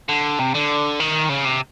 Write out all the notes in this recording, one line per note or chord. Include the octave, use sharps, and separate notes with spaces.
D3
C3
D3
D#3
C#3
C3